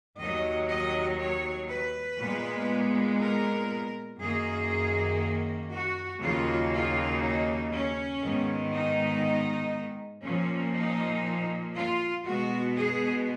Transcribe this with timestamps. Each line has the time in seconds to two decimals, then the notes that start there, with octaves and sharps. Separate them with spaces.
0.17 D#2 D#3 F#3 D#5
0.68 D#5
1.17 C#5
1.68 B4
2.18 A#2 G#3 B3
3.19 A#4
4.19 F#2 D#3 A#3 G#4
5.71 F#4
6.21 D#2 C#3 F#3 A#3 F4
6.71 F4
7.22 D#4
7.72 C#4
8.23 G#2 D#3 G#3 B3
8.72 D#4
10.23 A#2 F3 A#3 C#4
10.74 D#4
11.75 F4
12.25 B2 G#3 B3 F#4
12.76 G#4